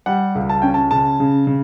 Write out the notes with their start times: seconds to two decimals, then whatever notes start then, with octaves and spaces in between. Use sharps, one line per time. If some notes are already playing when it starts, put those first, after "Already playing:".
0.06 G3 F#5
0.35 C#2
0.49 A5
0.62 C#4 G5
0.74 A5
0.91 C#3 A5
1.20 C#3
1.47 C#3